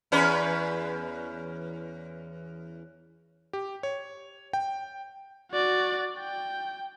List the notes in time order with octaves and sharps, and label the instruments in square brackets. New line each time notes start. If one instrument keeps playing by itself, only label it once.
[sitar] E2 C#4 B4
[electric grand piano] G4
C#5
G5
[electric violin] F#4 D5
G5